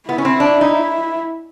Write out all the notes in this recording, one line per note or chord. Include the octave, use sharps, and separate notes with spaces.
B3 E4
C#4
C4
D4
D#4